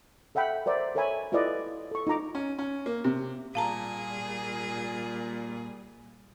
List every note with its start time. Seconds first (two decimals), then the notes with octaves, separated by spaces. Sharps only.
0.35 A4 E5 F#5 G5 B5
0.66 A#4 C5 D5 E5
0.95 A4 A#4 C#5 E5 G#5 B5
1.32 E4 F4 A4 B4 D5 D#5
1.91 A4 C#6
2.07 D#4 F4 A#5 D6
2.35 C#4
2.59 C#4
2.86 A#3
3.04 C3
3.55 A#2 G3 G#4 F5 A5 A#5